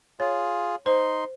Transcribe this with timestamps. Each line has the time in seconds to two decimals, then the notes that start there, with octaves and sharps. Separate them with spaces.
0.20 F4 G#4 C#5
0.86 D#4 C5 C6